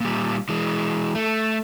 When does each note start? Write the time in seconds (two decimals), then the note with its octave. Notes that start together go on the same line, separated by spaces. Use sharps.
0.01 A#2 G3
0.49 E3 G#3
1.15 A3